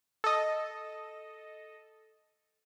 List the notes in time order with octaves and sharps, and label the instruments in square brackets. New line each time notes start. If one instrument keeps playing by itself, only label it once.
[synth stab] A4 D#5